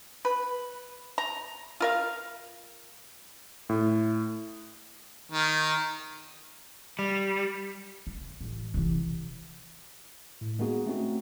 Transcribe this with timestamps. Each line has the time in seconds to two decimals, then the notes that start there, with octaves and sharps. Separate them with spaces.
0.25 B4
1.18 A#5
1.80 F4 A#4 F5
3.69 A2
5.32 D#3
6.99 G3
8.07 C#3
8.41 A1
8.74 C3 E3
10.41 A2
10.59 G#3 A#3 B3 D#4 F#4 G#4
10.87 A3 C4 C#4 D#4 F#4